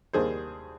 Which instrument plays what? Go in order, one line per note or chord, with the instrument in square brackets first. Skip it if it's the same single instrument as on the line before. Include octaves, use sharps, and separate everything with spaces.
[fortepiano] D#2 D#3 G3 D4 G#4 C5